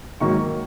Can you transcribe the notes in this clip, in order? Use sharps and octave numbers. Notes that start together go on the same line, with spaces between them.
G#2 D#3 F#3 A#3 C#6